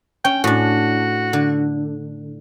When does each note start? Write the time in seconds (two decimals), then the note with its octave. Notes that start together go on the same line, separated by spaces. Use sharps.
0.25 C#4 G5
0.44 A2 D4 F#4
1.33 D3